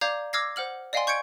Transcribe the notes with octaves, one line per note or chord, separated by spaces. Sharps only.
D5 F5 A#5 D6 G6 G#6
D6 E6 F6 G#6 A#6 C7
C5 F#5 F6 F#7
D5 D#5 F5 G5 G#5 C6
C#6 G6 G#6 C#7 D7